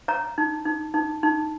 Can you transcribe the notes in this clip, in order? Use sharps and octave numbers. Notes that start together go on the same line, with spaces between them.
C#5 A#5
D#4
D#4
D#4
D#4